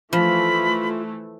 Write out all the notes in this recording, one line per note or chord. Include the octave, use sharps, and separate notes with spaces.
E3 F3 A3 F4 B5